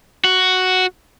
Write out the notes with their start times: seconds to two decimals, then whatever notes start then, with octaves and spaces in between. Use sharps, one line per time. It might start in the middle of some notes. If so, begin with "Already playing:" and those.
0.24 F#4